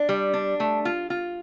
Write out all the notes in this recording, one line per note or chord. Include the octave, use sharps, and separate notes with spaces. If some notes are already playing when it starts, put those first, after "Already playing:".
Already playing: D4
G3
D4
A3
F4
F4